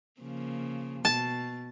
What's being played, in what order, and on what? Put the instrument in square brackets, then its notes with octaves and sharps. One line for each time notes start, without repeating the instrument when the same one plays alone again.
[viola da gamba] C#3 F3 A#3
[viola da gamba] B2 [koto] A5